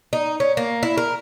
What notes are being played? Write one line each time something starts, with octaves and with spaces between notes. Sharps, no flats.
D#4
C#4
A#3
E4
A#4